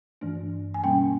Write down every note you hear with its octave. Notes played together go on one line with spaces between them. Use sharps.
G2 E3 A3 D4
G#5
B2 G3 A#3 C#4 G5